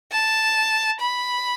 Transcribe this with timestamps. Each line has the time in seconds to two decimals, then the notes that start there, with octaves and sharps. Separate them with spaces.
0.12 A5
1.00 B5